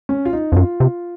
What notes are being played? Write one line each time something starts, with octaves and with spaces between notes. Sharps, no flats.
C#4
F4
D#4
F2
F#2 F4
C3